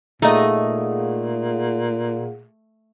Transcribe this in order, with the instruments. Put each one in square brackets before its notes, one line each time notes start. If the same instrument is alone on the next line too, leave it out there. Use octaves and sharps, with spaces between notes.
[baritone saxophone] A#2 [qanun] A3 [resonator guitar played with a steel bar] D#4 D#5 [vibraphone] G#4 F5 F#5